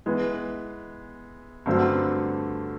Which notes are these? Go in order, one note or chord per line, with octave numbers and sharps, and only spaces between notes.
E3 G#3 B3
G2 D3 F#3 A3 C4